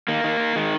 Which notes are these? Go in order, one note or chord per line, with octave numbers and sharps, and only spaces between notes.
D#3 A#3
D#3
D#3
D#3 G#3